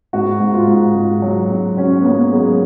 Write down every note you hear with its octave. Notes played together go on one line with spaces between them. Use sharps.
G#2 F#4
G#2
F4
G#2
G#2
F#3
G#2
F#3 C#4
B3
F#3 A#3
F#3 G#3